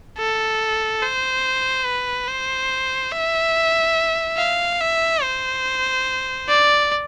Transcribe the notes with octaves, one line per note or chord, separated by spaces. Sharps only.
A4
C5
B4
C5
E5
F5
E5
C5
D5